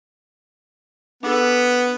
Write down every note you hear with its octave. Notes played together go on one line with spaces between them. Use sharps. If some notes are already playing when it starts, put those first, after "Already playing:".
B3 D4 A4